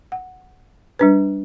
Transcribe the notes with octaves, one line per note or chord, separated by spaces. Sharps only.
F#5
G3 D4 B4